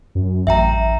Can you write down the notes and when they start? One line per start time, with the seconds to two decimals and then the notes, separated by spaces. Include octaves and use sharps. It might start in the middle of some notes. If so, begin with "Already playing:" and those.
0.15 F#2
0.47 A1 E5 G5 A#5